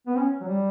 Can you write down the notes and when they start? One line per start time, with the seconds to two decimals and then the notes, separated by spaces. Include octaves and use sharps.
0.07 B3
0.17 C#4
0.41 F#3
0.48 G3